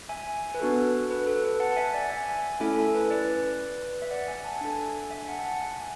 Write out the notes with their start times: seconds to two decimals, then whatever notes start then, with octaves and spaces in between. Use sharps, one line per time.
0.09 E5 G#5
0.54 B4
0.60 B3 D4 F#4 A4
1.10 B4
1.27 A4
1.44 B4
1.60 F#5 A5
1.76 E5 G#5
1.93 D5 F#5
2.10 E5 G#5
2.60 A3 C#4 E4 A4 E5 G#5
2.77 A4
2.95 B4
3.10 B4 D5
4.02 E5
4.10 D5 F#5
4.28 E5 G#5
4.44 F#5 A5
4.56 A5
4.61 D4 A4 E5 G#5
5.11 E5 G#5
5.28 F#5 A5
5.44 F#5 A5
5.61 E5 G#5